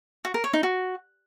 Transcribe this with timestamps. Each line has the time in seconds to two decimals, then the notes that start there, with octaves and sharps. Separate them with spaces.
0.25 F#4
0.34 A#4
0.44 C#5
0.53 D#4
0.63 F#4